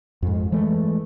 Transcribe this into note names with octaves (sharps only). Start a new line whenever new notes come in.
F2 G#2
E3 G#3 A3